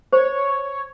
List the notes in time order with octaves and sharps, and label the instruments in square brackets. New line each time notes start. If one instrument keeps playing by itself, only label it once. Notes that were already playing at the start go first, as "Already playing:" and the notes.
[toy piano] C5 [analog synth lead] C#5